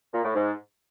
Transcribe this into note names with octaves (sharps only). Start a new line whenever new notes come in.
A#2
A2
G#2